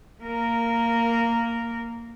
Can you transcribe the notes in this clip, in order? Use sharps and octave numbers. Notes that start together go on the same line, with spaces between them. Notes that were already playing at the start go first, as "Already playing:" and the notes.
A#3 A#4